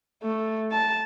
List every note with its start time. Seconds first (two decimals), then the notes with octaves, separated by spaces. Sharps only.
0.23 A3
0.72 A5